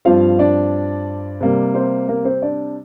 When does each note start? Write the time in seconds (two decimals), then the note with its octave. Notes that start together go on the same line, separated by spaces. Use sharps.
0.05 G2 F3 C4 F4 F5
0.39 D4 D5
1.41 C3 G3 A#3
1.75 C4 C5
2.08 A#3 A#4
2.25 C4 C5
2.42 D4 D5